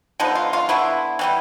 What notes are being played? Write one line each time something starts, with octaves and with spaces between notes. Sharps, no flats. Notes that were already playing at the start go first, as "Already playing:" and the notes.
D3 F3 G#3 B3 D#4
F4
F4
D3 F#3 B3 E4
E3 G3 B3